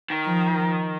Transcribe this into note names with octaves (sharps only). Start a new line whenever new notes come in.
D#3
F3